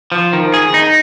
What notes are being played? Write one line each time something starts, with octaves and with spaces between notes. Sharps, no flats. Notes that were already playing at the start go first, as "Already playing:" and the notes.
F3
D#3
G#4
D#4